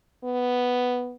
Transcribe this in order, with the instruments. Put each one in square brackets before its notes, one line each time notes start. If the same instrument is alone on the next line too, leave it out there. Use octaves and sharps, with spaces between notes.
[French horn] B3